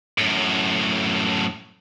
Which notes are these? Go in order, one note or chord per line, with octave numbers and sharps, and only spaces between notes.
F#2 A2